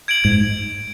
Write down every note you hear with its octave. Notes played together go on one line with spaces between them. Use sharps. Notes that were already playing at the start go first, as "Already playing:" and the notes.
G#6 D7 F#7
G#2 G#6